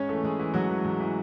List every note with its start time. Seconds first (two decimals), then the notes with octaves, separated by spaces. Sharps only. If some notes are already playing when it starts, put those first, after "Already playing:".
Already playing: G#2 C#4 C#5
0.09 E3 A3 A4
0.23 G#2 G#3 G#4
0.39 E3
0.54 G#2 F#3 F#4
0.69 E3
0.85 G#2
1.00 E3